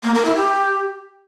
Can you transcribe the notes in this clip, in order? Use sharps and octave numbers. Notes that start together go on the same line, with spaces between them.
A#3
A#4
E4
G4